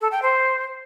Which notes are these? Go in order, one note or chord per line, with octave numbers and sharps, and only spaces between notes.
A4
G5
C5